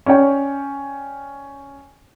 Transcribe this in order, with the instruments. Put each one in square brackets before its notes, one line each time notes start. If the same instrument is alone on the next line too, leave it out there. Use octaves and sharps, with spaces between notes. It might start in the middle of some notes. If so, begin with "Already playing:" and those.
[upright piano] C#4 C#5 D5 G5